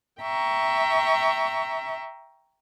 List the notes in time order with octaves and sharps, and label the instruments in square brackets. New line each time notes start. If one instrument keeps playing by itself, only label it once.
[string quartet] E5 G5 A#5 C#6